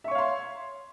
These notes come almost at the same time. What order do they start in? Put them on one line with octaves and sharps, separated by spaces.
E5 C#6 C#5 F5 C6